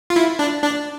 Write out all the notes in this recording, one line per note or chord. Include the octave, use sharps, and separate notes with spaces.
F4
E4
D4
D4